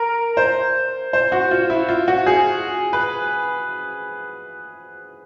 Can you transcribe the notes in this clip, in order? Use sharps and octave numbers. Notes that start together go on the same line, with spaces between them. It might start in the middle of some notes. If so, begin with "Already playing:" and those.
Already playing: A#4
C5
C5
F#4
F4
E4
F4
F#4
G#4
B4